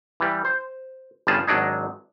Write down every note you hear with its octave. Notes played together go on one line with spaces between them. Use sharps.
E3 G3
C5
G1 C#3 G3 F4 G#4 A5
G#1 F#3 D4 D#4 G#4